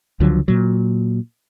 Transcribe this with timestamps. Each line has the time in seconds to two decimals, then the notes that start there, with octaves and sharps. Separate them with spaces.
0.20 C#2 D3 F3 F#3
0.48 A#2 F#3